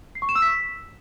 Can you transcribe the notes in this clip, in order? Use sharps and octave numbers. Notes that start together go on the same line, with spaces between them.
C7
C#6
E7
E6
B6